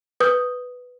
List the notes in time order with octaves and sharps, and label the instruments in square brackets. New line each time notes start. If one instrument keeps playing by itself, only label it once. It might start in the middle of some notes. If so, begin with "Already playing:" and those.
[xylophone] B4 D#6 G6